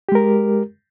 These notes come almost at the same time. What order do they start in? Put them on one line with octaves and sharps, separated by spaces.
G4 G#3 A#4